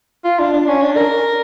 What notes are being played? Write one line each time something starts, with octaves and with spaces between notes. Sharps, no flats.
F4
D4
D4
C#4
D4
A#4